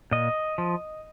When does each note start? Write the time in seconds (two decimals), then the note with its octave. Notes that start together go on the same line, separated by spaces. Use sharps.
0.11 A#2 D#5
0.58 F3